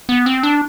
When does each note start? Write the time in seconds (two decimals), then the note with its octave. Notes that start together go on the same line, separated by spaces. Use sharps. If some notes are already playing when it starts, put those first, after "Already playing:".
0.09 B3
0.26 C4
0.43 D4